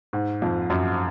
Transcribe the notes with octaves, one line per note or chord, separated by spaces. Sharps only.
G#2
F2
F#2